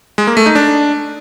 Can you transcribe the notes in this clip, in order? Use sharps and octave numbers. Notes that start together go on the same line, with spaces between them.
G#3
A#3
A3
D#4
D4